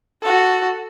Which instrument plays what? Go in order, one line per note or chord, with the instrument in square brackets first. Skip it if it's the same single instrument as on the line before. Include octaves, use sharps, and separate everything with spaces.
[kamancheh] F#4 A4